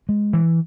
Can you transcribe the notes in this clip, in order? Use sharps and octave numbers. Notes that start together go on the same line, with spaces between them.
G#3
E3